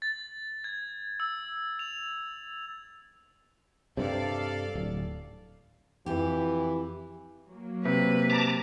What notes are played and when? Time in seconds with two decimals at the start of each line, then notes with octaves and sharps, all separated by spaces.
0.02 A6
0.64 G#6
1.20 E6
1.79 F7
3.97 G2 C3 A4 D5 F5
4.75 D1
6.06 F2 E3 G4
7.47 F#3 A#3
7.85 C3 B4
8.30 A5 A#5 D6